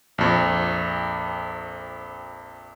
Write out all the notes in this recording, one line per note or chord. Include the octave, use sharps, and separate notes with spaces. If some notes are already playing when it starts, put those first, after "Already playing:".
A#1 F2